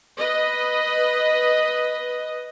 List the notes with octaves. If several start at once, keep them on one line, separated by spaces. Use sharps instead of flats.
B4 D#5